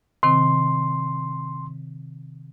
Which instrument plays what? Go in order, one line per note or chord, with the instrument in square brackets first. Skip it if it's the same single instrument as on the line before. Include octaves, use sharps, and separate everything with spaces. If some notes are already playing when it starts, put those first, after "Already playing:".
[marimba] C3 D#3 C4 [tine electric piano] C6